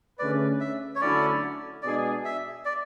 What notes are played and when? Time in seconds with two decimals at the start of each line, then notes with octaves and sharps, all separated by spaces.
0.18 D3 A3 C#4 G#4 B4 D5
0.60 E5
0.95 C#5
1.01 D3 F#3 A3 C#4 E4 D5
1.83 B2 G#3 D4 G#4 D5
2.25 E5
2.65 D5